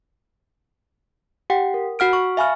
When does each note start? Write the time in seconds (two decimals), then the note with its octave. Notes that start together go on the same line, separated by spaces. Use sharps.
1.50 G4 F#5 G5
1.74 A#4
1.99 F#4 F#5 F6 D7
2.13 C#6
2.37 E5 F5 G#5 B5 C#6 F6